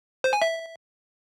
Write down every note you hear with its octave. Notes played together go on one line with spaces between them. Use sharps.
C5
G#5
E5